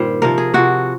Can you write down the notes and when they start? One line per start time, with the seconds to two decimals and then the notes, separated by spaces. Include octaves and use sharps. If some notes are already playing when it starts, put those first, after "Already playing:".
Already playing: G2 A#2 D#3 G3 C5
0.22 C3 F3 A#4
0.38 G#4
0.54 C3 F3 F#4